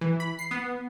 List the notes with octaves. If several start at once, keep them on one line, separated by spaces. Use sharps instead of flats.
E3
B5
C7
B3